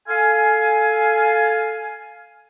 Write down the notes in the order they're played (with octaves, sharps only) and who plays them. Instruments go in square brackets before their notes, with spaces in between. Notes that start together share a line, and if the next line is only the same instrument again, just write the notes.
[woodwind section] A4 F5 G#5